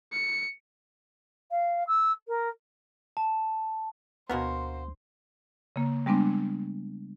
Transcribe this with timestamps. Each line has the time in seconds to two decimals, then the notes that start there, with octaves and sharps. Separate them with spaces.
0.13 C#7
1.51 F5
1.88 E6
2.28 A#4
3.17 A5
4.30 D2 B2 A#3 B3 F#4 A#4 C5
5.76 C#3 A#3
6.06 G3 G#3 B3 C4 D4